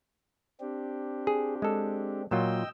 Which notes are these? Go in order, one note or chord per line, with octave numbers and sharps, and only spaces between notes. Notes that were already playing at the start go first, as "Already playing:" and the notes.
C4 D4 G4
G#4
G#3 A4
A#2 F#3 F4 D#5 G5 E6